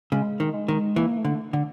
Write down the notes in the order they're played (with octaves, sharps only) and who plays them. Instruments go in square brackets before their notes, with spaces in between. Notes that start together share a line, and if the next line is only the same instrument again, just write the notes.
[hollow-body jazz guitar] C#3 [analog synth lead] G#3
[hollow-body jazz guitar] D#3
[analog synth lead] G#3
[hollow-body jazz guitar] D#3
[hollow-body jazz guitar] E3 [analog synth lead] A#3
[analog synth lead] A3
[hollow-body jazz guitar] D3
D3